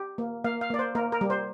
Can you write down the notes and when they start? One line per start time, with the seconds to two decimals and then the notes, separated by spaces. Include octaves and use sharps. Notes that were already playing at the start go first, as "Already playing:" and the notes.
Already playing: G4
0.18 A#3
0.44 A#3 F5
0.61 F5
0.70 A#3 D5
0.79 C5
0.95 A#3 A#4
1.12 A#4
1.21 G3
1.30 C5